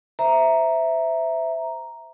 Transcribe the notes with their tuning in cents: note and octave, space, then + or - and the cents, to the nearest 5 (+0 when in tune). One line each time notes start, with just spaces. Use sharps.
C5 -20 E5 +0 A#5 +0